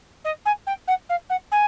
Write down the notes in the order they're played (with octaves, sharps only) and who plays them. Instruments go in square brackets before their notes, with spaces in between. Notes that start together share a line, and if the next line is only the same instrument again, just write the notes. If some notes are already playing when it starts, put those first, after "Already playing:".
[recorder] D#5
G#5
G5
F#5
F5
F#5
G#5